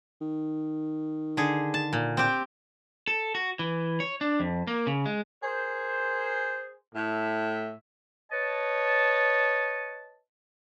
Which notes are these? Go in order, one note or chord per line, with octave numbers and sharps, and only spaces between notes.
D#3
D3 G#4
A5
A#2
C4 G4
A4
F#4
E3
C#5
D4
F2
A#3
C#3
G#3
G#4 A#4 C5
A2 E5
B4 C#5 D#5 A5